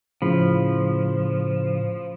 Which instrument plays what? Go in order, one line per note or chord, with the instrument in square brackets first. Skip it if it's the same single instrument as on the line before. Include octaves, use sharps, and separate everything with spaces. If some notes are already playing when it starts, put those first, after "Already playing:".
[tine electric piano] A2 C#3 B5 [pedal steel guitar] F3